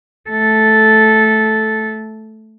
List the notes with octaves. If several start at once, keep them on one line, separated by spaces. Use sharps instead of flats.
A3 A4